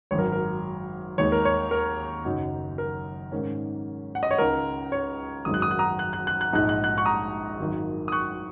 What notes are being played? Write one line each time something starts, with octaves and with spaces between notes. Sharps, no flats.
G#1 F#2 F#3 C#5
A#4
A#4
D#2 D#3 G#3 C#5
A#4
C#5
A#4
F#1 F#2 F#3 D#4
A#4
G#2 D#3 A#3 C#4
F#5
D#5
C#5
C#2 C#3 A#3 D#4 A#4
C#5
G#1 F#2 D#3 G#3 D#4 D#6
F#6
D#6
F#6
A#5 D#6
F#6
F#6
F#6
F#6
A#1 G#2 G#3 D#4 F#6
F#6
F#6
C#6 F#6
A#5 D#6
G#1 F#2 D#3 A#3
D#6
C#6 F#6